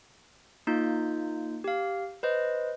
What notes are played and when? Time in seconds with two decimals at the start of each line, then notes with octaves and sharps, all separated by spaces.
0.67 A#3 D#4 F4 G6
1.64 G4 F5
2.23 B4 C5 D#5